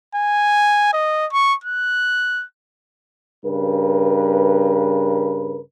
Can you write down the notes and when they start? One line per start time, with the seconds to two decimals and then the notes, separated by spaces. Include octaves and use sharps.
0.15 G#5
0.93 D#5
1.32 C#6
1.64 F#6
3.45 G2 C#3 A#4 B4